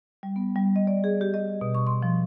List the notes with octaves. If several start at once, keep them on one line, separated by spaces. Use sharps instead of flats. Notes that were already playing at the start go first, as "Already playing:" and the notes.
G3
B3
G3
D#5
D5
G#4
G4
D#5
B2
C#6
C6
F3